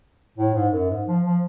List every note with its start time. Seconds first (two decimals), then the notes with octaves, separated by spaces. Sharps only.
0.38 A2
0.54 G#2
0.72 F#2
0.90 G#2
1.07 F3
1.25 F3